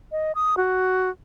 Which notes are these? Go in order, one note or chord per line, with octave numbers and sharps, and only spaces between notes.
D#5
D#6
F#4